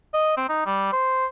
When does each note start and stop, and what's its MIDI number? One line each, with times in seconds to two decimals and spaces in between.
0.14 0.36 75
0.37 0.47 60
0.49 0.62 63
0.66 0.90 55
0.93 1.26 72